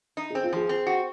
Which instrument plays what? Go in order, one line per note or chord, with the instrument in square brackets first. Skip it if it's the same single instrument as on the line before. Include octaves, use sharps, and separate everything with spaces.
[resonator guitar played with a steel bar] D#4
[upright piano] G#4
[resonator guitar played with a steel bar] C4
[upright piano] F4
[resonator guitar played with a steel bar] F3 [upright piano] G#4
[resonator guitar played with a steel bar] C4
F#4